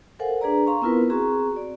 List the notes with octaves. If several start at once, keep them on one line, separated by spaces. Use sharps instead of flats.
A4 A#4 C5 F5 F#5 G#5
D4 G#4 B4 D5 A#5
F5 A#5 C6 C#6
B3 C4 E4 F4 A#4 B4
C4 F#4 G#4 A#5 C#6
D5